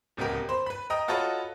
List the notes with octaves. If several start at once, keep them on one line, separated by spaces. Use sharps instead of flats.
D1 C#2 B3 G4 A#4
C5 B5
B4 B5
D#5 G5 A#5 D#6
F4 F#4 A4 B4 C#5 D#5